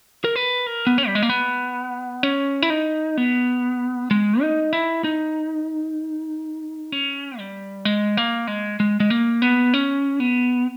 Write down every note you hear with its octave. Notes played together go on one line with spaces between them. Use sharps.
A#4
B4
A#4
B3
C#4
G3
G#3
A#3
B3
C#4
E4
D#4
B3
G#3
D#4
E4
D#4
C#4
G3
G#3
A#3
G#3
G#3
G#3
A#3
B3
C#4
B3